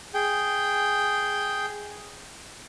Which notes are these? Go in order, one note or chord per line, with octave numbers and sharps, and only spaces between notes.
G#4 G5